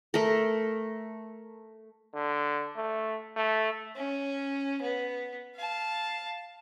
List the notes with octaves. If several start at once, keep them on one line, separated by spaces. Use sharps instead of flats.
A3 A#4
D3
A3
A3
C#4
B3
F5 A5